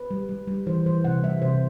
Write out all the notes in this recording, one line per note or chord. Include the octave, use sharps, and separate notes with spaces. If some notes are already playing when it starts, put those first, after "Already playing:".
Already playing: B4
G3
G3
G3
E3 C5
E3 C5
C3 F#5
G3 E5
C3 C5